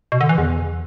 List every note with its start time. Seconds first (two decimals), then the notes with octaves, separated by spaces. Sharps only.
0.12 B2
0.21 D3
0.29 E3
0.38 E2